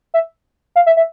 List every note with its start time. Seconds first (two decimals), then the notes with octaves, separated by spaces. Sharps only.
0.14 E5
0.76 F5
0.86 E5
0.97 E5